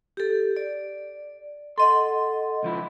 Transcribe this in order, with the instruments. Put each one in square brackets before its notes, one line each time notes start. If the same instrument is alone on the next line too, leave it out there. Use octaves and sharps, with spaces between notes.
[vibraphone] G4 A4
D5
[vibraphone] A4 D#5 F#5 [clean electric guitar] C6
[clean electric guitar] C#2 F3 E4